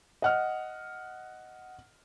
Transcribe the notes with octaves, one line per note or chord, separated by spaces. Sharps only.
D#5 F#5 F6